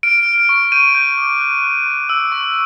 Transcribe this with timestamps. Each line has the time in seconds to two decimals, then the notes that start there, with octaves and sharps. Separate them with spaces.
0.03 F6 D7
0.26 F6
0.49 C#6
0.72 G6 D#7
0.95 G6
1.18 D6
1.40 F#6
1.63 F#6
1.86 C#6
2.09 E6
2.32 C#6